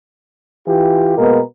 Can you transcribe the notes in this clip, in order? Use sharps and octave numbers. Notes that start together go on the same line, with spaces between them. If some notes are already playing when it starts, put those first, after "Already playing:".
E3 F4 G4
B2 G#3 A#3 B3 A#4